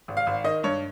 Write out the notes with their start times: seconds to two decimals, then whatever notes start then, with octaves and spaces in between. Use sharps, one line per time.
0.08 G#1
0.17 F5
0.27 G#1
0.44 D#3 D#5
0.63 G2 C#5